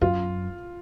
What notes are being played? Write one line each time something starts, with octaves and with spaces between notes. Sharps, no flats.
F#2 F4